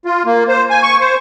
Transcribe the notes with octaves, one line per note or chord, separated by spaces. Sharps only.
F4
A#3
C5
G#5
C#6
C5